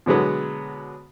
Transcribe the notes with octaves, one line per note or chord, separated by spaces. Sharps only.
B2 D3 F#3 G#3 B3